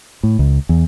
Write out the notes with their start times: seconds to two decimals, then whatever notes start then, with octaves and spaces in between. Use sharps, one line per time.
0.23 A2
0.39 C#2
0.69 E2